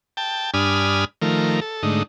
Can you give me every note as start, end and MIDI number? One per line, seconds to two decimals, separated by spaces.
0.17 0.51 79
0.17 0.51 81
0.54 1.05 43
0.54 1.05 62
0.54 1.05 80
0.54 1.05 83
0.54 1.05 87
0.54 1.05 89
1.22 1.60 51
1.22 1.60 53
1.22 1.60 57
1.22 1.60 70
1.61 1.83 69
1.83 2.03 44
1.83 2.03 50
1.83 2.03 57
1.83 2.03 63